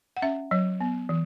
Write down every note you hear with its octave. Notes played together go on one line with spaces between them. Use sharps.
F#5
C#4 E5
F#3 C#5
B3
E3